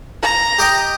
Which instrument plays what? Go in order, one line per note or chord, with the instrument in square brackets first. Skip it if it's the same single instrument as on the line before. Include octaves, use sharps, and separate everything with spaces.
[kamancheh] A#5
[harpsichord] G4 D#5 G5